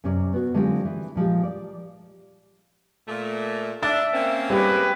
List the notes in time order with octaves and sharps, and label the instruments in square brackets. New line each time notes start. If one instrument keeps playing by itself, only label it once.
[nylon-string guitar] F#2 C3 C#4 D5
B3 F#4
D3 F#3 G#3 C4 F4 G4
E3
A#2 F3 G#3 G4
D5
[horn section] A#2 A3
[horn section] D4 [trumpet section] E5 [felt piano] A6
[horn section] A#3 C4 C#4
[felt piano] G3 G4 [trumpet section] G#3 B4